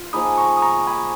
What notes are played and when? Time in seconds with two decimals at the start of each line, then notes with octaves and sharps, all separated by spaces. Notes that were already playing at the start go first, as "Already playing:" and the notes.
Already playing: F4
0.13 F3 A#3 D#4 G#4 B5 D#6
0.38 A#5 C#6
0.57 D#6
0.62 A#5 C#6
0.87 G#5 B5